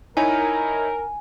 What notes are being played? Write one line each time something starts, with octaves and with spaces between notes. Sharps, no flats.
D#4 E4 A#4 C#5 G#5